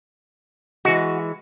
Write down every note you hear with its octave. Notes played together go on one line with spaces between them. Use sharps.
E3 G#3 F#4